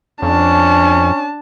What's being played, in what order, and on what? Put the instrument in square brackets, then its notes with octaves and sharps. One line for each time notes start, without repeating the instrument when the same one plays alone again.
[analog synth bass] F2 [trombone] C#4 [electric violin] D4 A5